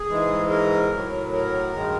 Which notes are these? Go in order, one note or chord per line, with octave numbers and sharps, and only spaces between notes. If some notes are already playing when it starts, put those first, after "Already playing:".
Already playing: G#4
G#2 E3 G#3
A#4
A2 F#3
A#4
G2 D#3 G#3